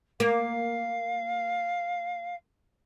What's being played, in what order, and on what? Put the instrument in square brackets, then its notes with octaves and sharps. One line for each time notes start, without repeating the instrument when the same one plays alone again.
[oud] A#3 [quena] F5